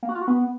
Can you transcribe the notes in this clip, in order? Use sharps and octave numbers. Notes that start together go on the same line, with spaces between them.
A#3
F#4
F4
F#4
B3